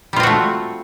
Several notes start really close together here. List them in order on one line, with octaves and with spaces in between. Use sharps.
G3 F4 C4 F#4 A3